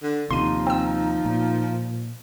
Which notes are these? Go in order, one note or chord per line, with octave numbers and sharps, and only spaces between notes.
D3
D#2 C3 F3 D#4 C6 D#7
C4 E6
A#2